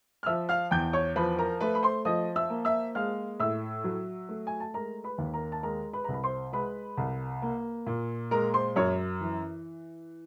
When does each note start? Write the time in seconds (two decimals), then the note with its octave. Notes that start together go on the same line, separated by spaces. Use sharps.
0.23 F6
0.26 F3 E5 E6
0.49 F5 F6
0.71 E2 G5 G6
0.93 C#5 C#6
1.16 F3 B4 B5
1.38 A#4 A#5
1.60 A3 B4 B5
1.75 B5
1.83 C5 C6
2.05 F3 D#5 D#6
2.36 E5 E6
2.50 A#3
2.65 E5 E6
2.95 G#3 F5 F6
3.40 A2 E5 E6
3.84 F#3
4.29 A3
4.47 G#5
4.60 A5
4.74 G#3 A#4 A#5
5.04 B4 B5
5.18 D#2
5.34 A#4 A#5
5.52 A5
5.63 G#3 A#4 A#5
5.93 B4 B5
6.04 C2 A#5
6.14 B5
6.24 C5 C6
6.52 G#3 B4 B5
6.98 C2
7.42 A#3
7.87 A#2
8.31 G#3 A#4 A#5
8.54 C5 C6
8.76 F#2 C#5 C#6
9.21 E3